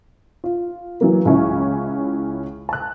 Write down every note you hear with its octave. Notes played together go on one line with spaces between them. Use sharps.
F4
E3 F#3 A#3
C#2 C#4 E4
A5 F#6